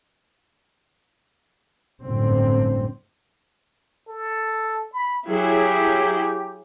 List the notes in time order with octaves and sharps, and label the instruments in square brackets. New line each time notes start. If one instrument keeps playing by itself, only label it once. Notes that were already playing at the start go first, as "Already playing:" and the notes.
[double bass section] G1 F#2 A2 D3 C4
[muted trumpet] A4
B5
[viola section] F#3 E4 G#4 [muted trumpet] G4